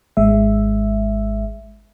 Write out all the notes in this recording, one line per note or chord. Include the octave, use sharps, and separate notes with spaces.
G#1 G#3 E5